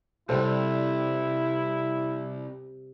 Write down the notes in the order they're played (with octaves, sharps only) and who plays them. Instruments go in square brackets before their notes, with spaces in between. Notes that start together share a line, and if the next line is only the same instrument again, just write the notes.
[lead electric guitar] C2 [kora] C3 G3 [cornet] E4 [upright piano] A4 C5